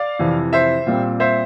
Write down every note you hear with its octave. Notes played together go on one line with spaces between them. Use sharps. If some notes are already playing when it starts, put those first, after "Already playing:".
Already playing: D5 F5
F2 C3 E3
C5 E5
A#2 G3 C4
C5 E5